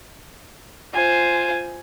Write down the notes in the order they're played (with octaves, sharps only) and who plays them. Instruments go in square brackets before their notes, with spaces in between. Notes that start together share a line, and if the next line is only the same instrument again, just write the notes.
[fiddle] F4 C5 [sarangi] G#5